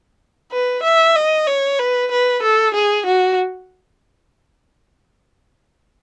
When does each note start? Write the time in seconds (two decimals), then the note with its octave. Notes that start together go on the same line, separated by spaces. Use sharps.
0.52 B4
0.83 E5
1.15 D#5
1.47 C#5
1.79 B4
2.11 B4
2.43 A4
2.74 G#4
3.07 F#4